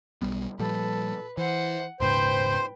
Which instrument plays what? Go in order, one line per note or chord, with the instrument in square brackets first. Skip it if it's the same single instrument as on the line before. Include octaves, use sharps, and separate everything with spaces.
[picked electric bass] B1 G3 B3
[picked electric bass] A#2 F3 G3 [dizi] A4 [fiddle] B4
[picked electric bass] E3 [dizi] C5 [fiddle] F#5
[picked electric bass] D#1 G#2 C#3 [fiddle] B4 G5 [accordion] C5 [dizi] C6